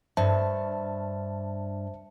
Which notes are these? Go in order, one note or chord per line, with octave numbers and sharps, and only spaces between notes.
G2 C5 E5 A5